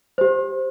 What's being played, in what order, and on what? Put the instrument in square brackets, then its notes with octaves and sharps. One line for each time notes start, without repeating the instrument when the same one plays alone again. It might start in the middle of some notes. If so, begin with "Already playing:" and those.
[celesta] G4 C5